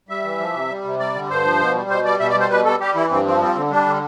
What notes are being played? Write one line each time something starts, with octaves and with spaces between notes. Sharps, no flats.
G3 E5
E3
F3
C3
G3
C3
G3 D5
D3
G2 C5
F3
B2
G3
B2 C5
G3 D5
B2 E5
D5
G3
C5
B2 B4
G3 A4
G3 G4
E3 E4
G2 C4
F3 C4
G3 C4
D3
G3 D4
D3